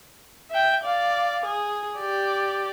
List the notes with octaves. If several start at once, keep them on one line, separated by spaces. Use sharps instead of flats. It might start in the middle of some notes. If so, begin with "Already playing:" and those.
E5 G5
D5 F5
G#4
G4 D5